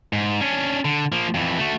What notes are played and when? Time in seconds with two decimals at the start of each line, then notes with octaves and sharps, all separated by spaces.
0.13 G#2
0.41 C#4 D4
0.85 D3
1.12 F3 A#3
1.34 F2 E3
1.58 A3 F#4